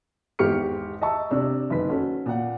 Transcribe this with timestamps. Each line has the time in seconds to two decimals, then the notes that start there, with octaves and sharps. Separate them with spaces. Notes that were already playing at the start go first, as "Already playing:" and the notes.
0.39 G#1 E2 G4 C#6 F6 C#7
1.01 D#5 E5 A5 C#6 E6
1.31 C3 D4 E6
1.70 F#1 D#3 B4 B6
1.90 C#4 F#4 A4
2.26 A#2 F#5